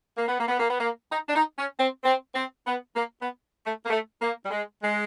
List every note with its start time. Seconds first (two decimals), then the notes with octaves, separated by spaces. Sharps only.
0.17 A#3
0.28 B3
0.38 A#3
0.48 B3
0.58 A#3
0.69 B3
0.79 A#3
1.10 D#4
1.28 D4
1.34 D#4
1.58 C#4
1.80 C4
2.03 C4
2.35 C4
2.66 B3
2.96 A#3
3.20 B3
3.66 A3
3.85 A#3
3.89 A3
4.21 A#3
4.44 G3
4.51 G#3
4.82 G#3